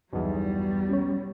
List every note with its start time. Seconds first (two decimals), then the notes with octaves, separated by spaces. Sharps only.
0.13 B1 E2 G2 F#3 G3
0.89 C#4 C#5